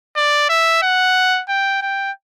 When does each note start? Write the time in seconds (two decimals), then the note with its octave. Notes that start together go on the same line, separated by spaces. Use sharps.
0.16 D5
0.49 E5
0.82 F#5
1.49 G5
1.82 G5